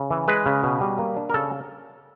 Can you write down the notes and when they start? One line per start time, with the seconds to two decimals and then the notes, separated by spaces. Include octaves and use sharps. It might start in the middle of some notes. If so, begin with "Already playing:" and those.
Already playing: C#3
0.11 E3
0.28 G#3 B4
0.46 C#3
0.63 B2
0.81 G3
0.98 A#3
1.16 D4
1.30 A#4
1.34 C#3 A4